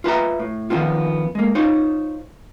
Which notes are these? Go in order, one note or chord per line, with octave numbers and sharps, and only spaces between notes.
F4 B4 E5 A#5
A2
D#3 F3 B3 C4 F4
G#3 A#3
D#4 F4 C5 C#5